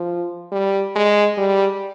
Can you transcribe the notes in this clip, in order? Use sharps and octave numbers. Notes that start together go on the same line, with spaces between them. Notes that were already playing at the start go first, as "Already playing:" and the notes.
Already playing: F3
G3
G#3
G3